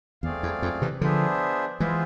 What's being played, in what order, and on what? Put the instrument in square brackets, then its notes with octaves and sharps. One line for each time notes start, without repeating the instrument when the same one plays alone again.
[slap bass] E2 [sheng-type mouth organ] A3 C4 G#4 D5 F5
[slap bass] E2
F2
C3 E3
[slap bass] D3 F3 [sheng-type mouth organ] B3 D4 G#4 C5 E5
[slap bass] E3 G#3 [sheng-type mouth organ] B3 F4 G#4 C5 E5